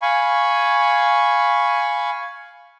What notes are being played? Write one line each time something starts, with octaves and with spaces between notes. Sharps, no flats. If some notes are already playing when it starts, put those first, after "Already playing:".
F5 G#5 B5 C#6